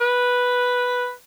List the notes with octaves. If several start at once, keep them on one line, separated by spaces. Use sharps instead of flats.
B4